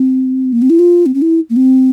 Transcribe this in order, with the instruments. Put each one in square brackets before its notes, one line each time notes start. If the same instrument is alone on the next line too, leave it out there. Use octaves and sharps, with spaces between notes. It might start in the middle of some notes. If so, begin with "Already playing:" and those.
Already playing: [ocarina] C4
A#3
C4
E4
F4
C4
C#4
E4
A#3
C4